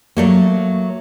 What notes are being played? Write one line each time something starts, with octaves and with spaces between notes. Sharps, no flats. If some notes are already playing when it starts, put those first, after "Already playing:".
F#3 A3 A#3